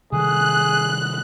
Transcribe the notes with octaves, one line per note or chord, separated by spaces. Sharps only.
C3 D#3 G3 G#4 F#6